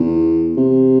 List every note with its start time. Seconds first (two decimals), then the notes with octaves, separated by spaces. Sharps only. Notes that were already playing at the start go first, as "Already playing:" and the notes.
Already playing: E2
0.57 C3